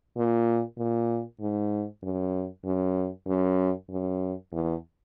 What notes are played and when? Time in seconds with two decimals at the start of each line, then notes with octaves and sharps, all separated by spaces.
0.17 A#2
0.78 A#2
1.41 G#2
2.03 F#2
2.65 F#2
3.27 F#2
3.90 F#2
4.52 E2